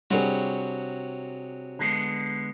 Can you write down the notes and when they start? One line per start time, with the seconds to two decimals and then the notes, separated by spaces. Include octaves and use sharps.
0.11 C3 F#3 G3 D4 F#4 G#4
1.79 D3 G#3 B3